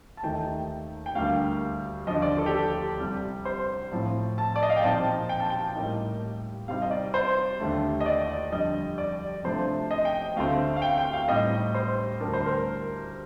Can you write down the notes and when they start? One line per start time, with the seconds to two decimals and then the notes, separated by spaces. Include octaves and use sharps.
0.17 A5
0.23 D#2 D#3 A3 D#4 G5
1.06 G5
1.15 D2 D3 G3 A#3 F5
2.07 F3 D#5
2.10 D#2 D3
2.22 D5
2.38 A4
2.46 G4
2.54 A4
2.99 C2 C3 G3
3.45 C5
3.92 A2 F3 C4
4.38 A5
4.56 D5
4.63 D#5
4.69 F5
4.76 G5
4.83 A#2 F3 C4 D#4 A5
5.29 G5
5.40 A5
5.50 G5
5.75 A2 G3 A#3 D#4
6.68 C3 G3 C4 D#4 F5
6.82 D#5
6.91 D5
7.14 C5
7.60 D#2 D3 A3
8.00 D#5
8.06 D5
8.52 F2 D3 G3 D#5
8.98 D5
9.44 C3 F3 A3 D4 C5
9.91 D#5
10.05 G5
10.36 D2 D3 A3 C4 F5
10.76 F5
10.82 G5
10.98 G5
11.13 F5
11.28 A2 G3 C4 D#4 D#5
11.75 C5
12.20 D2 D3 G3 D4 A#4
12.33 C5
12.46 A#4